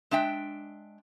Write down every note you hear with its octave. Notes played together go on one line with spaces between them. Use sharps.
G#3 D4 E5 G5